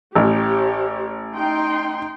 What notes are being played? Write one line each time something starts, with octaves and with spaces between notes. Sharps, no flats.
A1 G4 C#5
D#4 G5 C6